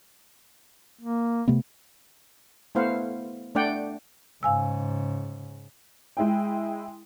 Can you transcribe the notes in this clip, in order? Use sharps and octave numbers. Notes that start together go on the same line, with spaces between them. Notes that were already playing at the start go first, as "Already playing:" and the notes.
A#3
C3 A3 B3
A3 B3 E4 C5 F5 F#5
A3 D4 D5 F#5 G5
G#2 C#3 F5 G#5 E6
G#3 E4 G5